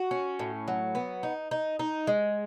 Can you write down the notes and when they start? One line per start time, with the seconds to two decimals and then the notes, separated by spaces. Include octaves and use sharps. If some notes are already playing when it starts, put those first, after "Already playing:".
Already playing: F#4
0.11 C#4
0.39 A2
0.68 F#3
0.95 B3
1.23 D#4
1.51 D#4
1.79 D#4
2.07 G#3